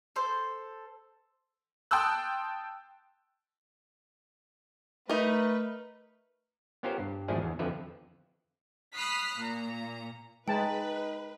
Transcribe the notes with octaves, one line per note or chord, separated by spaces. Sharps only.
A4 C5
G5 A5 C6 D#6 E6 F#6
A3 D#4 A#4 B4
B3 C#4 F4 G4 A#4 C5
G2
G#1 E2 F3 D4 E4 G#4
E2
F2 D3 F3 B4 E5
B5 D#6 F6 F#6 B6 C7
A#2 A#5
G#3 D#4 B4 G5 A5 A#5